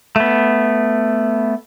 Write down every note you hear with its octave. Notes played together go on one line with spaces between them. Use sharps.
A3 B3